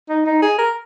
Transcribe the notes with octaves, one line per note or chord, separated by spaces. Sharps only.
D#4
D#4
G#4
A#4